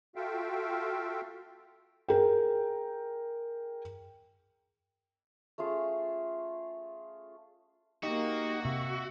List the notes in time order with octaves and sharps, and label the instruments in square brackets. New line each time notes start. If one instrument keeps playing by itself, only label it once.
[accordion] F4 F#4 A4 E5 F5 G5
[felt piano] G#4 A#4 G5
[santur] A3 C#4 F4 G#4
[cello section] A#3 [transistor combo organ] D#4 G4 D#5 [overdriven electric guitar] F#4
[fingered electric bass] C3 [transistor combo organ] E5